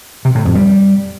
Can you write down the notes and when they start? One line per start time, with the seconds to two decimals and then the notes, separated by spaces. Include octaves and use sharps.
0.25 C3
0.35 A2
0.45 F2
0.55 G3